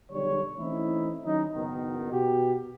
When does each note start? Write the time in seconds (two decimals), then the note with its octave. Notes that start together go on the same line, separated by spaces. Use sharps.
0.11 B1 D3 G3 C#5
0.58 E3 A3 C4 C#4 D#4 E4
1.25 D#3 F#3 C#4 D#4
1.56 F#1 B2 D#3
2.12 B2 F#4 G4